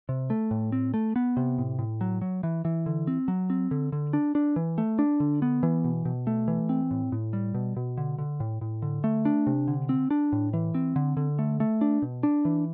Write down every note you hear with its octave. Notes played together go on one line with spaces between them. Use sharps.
C3
A3
A2
C4
A3
B3
C3
A2
A2
F#3
F#3
E3
E3
D3
C4
F#3
C4
D3
D3
D4
D4
E3
A3
D4
D3
B3
E3
B2
B2
A3
E3
C4
A2
A2
G3
B2
B2
D3
D3
A2
A2
D3
A3
D4
C3
D3
C4
D4
A2
E3
C4
D3
D3
A3
A3
D4
B2
D4
E3